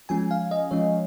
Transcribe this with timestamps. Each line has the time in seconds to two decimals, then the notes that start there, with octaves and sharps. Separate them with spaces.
0.09 F3 G#3 C#4 G#5
0.31 F5
0.51 D#5
0.71 F3 G#3 C#4 C#5